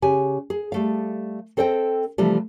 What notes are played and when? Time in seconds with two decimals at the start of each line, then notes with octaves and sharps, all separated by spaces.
0.02 C#3 G4 G#5
0.50 G#4
0.72 G3 A3 F5
1.57 C4 A4 C5 D#5 G5
2.18 C3 E3 F3 G3 A3